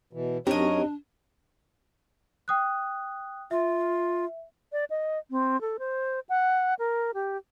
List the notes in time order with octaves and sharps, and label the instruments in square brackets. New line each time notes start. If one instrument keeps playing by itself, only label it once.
[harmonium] B2 E3
[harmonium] F#2 C#5 [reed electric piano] C4 D#4 G4 [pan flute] D4 [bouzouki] A#4 D#5
[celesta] G5 D#6 F#6
[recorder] F4 [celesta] E5
[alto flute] D5
D#5
C4
A4
C5
F#5
A#4
G4